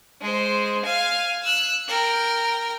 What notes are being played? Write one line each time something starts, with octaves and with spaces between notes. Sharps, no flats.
G#3 C5
F5 G#5
E6 F#6
A#4 G5